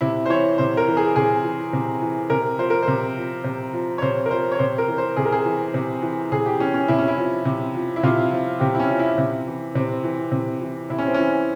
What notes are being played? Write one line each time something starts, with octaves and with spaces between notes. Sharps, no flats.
C3 E4
C5
E3 C#5
C3 C5
A#4
E3
G#4
C3 G#4
E3
C3
E3
C3 A#4
F3 C5
A#4
C5
C3
F3
C3
F3
C#5
C3 C5
A#4
F3 C5
C#5
C3 C5
A#4
E3
C5
C3 G#4
A#4
G#4
E3
C3
E3
C3 G#4
G4
E3 C#4
C#4
C3 E4
C#4
E4
F3
C3
F3
E4
C3 F4
F3
C3 G4
E4
C#4
F3
E4
C3
E3
C3 C4
E3
C3
E3
C3 E4
C#4
C4
E3 C#4